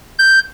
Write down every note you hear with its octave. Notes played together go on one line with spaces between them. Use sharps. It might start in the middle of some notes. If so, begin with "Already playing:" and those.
G6